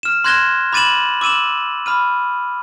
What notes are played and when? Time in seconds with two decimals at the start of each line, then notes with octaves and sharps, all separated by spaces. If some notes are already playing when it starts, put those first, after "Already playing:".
0.03 F6 E7
0.24 C6 F#6 G#6 A#6 E7 G7
0.73 B5 D6 A6 D#7 E7 F#7
1.21 D6 E6 D#7 E7 F#7
1.86 B5 F6 D#7